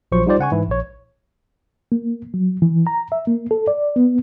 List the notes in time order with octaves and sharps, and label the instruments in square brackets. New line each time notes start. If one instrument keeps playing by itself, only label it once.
[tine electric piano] A#1 F3 F#3 C5 C#6
G3 D#4 F4 G4 C5 D5
C#3 F#5 G#5 C#6
G#2 E3 E4
A#1 C#5
[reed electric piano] A#3
F#3
E3
A#5
E5
A#3
A4
D5
B3